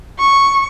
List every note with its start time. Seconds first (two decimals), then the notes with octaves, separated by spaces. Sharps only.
0.19 C#6